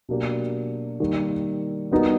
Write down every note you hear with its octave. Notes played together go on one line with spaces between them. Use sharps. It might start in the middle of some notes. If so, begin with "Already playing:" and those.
B2 F#3 A#3 D4 G4
D#3 G3 A#3
G3 B3 D#4 F#4 A#4